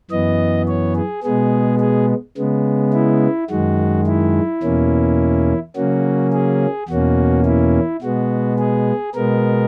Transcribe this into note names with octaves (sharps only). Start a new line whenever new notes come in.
F#2 E3 B3 D#5
C#5
G#4
B2 G#3 B3 G#4
G#4
C#3 G#3 B3
E4
F#2 D#3 G#3 F#4
E4
E2 B2 A#3 C#4
C#3 F#3 A#3 C#4 F#4
G#4
E2 B2 A#3 C#4 F#4
E4
B2 G#3 B3 F#4
G#4
B2 G#3 B3 A#4